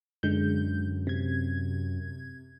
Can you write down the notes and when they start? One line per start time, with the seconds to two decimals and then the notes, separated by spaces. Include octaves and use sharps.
0.23 F#2 D3 G#3 G6
1.07 C3 G#6